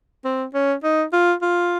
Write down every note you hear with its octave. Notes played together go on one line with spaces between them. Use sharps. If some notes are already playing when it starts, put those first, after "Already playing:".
C4
C#4
D#4
F4
F4